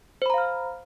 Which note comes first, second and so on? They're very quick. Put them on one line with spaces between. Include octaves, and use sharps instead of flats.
C5 B5 A#5 F5 F6